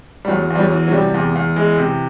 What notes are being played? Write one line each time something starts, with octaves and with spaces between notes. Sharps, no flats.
G3
E2 F#3
E2
G3
F#3
E3
F#3
C3 G3
E2
E2
E3 G#3
C3